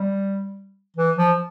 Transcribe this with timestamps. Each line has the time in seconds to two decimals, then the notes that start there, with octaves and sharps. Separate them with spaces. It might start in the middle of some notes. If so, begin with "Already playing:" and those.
Already playing: G3
0.97 E3
1.17 F3